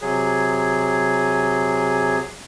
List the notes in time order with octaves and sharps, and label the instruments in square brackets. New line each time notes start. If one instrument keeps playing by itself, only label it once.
[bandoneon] C3 F#3 G#4